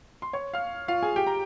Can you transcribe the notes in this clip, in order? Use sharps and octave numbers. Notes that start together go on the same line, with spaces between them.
C6
C#5 C#6
F5 F6
F4 F5
G#4 G#5
G4 G5
A#5